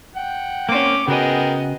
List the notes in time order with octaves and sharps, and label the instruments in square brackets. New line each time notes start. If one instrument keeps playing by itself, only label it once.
[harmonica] F#5 G5
[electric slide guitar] A#3 C4 C5 [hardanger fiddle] C#4 D6
[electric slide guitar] C#3 F#4 G#5 [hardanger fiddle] B3 D#5 [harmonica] G#4 A#4 G5